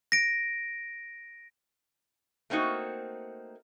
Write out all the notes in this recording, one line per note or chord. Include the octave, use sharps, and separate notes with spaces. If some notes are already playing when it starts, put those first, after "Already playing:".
A#6 D7
A3 A#3 C4 D#4 F#4